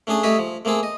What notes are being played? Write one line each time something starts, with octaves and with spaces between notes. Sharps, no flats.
A3 C#4 D4 G#4 A5
G3 A3 A4 C#5 D#5 E5
F3
A3 A#3 C4 G#4 A4
D#5